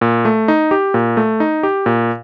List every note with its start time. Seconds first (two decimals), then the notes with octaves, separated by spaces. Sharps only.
0.01 A#2
0.25 A3
0.48 D#4
0.71 G4
0.94 A#2
1.17 A3
1.40 D#4
1.63 G4
1.86 A#2